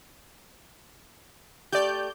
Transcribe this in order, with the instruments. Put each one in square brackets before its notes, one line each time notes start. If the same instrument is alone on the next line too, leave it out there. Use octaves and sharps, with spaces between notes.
[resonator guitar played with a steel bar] A3 G4 [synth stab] D5 G6